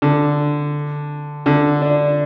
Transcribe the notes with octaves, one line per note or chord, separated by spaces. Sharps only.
D3
D3
D4